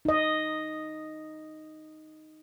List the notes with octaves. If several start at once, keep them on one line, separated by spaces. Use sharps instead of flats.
D#4 D#5